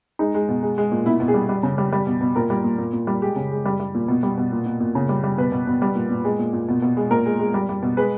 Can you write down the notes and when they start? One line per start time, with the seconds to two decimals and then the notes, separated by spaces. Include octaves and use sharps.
0.19 G#3 D#4
0.35 G#3
0.48 B2
0.63 G#3
0.78 G#3
0.92 A#2
1.05 B2 E4
1.20 B2
1.28 G#4
1.34 G3
1.49 G3
1.63 C#3
1.78 G3
1.93 G3
2.07 B2
2.21 B2
2.36 A#2 A#4
2.50 G3
2.64 A#2
2.78 A#2
2.93 A#2
3.07 G3
3.22 G#3 G4
3.36 C#3
3.52 G#3
3.66 G3
3.80 G3
3.95 A#2
4.08 B2
4.23 G3
4.37 B2
4.52 A#2
4.66 A#2
4.80 A#2
4.95 C#3
5.09 G3
5.24 G3
5.38 B2 B4
5.52 B2
5.67 B2
5.82 G3
5.95 A#2
6.11 A#2
6.25 G#3
6.39 A#2
6.53 A#2
6.68 B2
6.82 B2
6.97 G#3
7.10 A#2 A#4
7.26 G#3
7.40 G#3
7.54 G3
7.69 G3
7.82 B2
7.97 G#3 B4